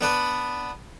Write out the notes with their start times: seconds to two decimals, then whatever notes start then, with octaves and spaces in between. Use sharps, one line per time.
0.01 B3 D4 B4